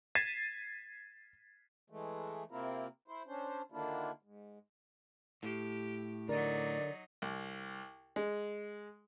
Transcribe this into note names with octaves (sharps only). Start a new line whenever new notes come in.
G#6 A6 B6 C7 D#7 E7
E3 G#3 A3
C3 A#3 C4 E4 F4 A#4
E4 C5
C#4 D4 C5
D3 D#3 A#3 D4 E4 F4
G#2
A2 G4
D3 F#3 D#4 A#4 D5
C2
G#3